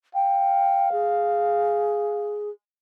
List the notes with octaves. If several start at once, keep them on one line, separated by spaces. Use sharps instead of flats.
F5 G5
G#4